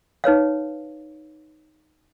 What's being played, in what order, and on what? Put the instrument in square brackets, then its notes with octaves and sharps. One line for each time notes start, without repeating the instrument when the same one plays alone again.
[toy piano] D#4 B4 C#5 F5